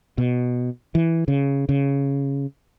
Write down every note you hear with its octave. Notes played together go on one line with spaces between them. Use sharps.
B2
E3
C#3
C#3